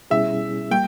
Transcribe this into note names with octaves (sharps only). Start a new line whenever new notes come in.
B2 G3 C#4 E4 G#4 E5
G3 A#3 G5